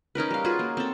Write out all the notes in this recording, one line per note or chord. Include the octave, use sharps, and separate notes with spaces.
C#4 D#4 A#4 B4
G3 F5
F4 F#4 G#4 B4
A#3
C4 A4